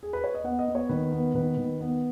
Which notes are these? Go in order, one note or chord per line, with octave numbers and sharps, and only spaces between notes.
G#4
B4
C#5
D#5
B3 F#5
D#5
B3
C#5
D#3 B4
B3
D#3 B4
D#3
B3